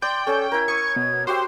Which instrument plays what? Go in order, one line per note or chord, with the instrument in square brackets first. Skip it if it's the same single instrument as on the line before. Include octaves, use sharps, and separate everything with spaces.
[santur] D5 [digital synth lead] G5 [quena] C6
[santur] C#4 [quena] A4
[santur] E4 A#4 [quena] G#6
[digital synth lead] C#6 [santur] D#6
[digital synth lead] B2
[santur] F#4 G4 E5 [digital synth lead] C5 [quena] C6